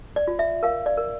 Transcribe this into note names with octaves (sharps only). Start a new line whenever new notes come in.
D5
F4
E5
A#4 F5
D5
A#4